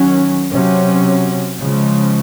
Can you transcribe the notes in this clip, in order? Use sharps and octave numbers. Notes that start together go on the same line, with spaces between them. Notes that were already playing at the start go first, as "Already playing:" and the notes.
Already playing: D#3 F#3 C#4
C3 F#3 C#4
C#3 F3 G#3